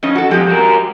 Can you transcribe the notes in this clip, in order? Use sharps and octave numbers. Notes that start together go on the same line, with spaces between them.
F2 C#4 D#5
F#4 A4
F2 G#3 G4
F#4 A#4